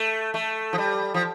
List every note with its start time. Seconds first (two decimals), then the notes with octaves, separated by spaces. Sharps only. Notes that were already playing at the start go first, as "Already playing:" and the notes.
Already playing: A3
0.34 A3
0.73 F3
0.78 G3
1.14 F3